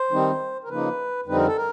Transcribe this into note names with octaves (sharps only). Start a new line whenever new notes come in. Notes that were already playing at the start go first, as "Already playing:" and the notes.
Already playing: C5
D#3 G3 C4 D#4
A#4
C#3 F3 A#3 D#4 B4
F2 D3 G3 C4 D#4 B4
A#4
A4
A#4